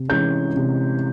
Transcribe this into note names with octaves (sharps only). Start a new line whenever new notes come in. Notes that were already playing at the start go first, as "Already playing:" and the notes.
Already playing: C3
E3 G#3 C#4 G6
C3